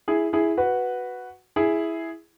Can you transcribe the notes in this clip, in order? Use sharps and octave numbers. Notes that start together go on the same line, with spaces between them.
E4 G#4
E4 G#4
F#4 B4
E4 G#4